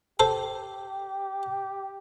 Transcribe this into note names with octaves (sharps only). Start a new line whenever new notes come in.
G4 A4 C5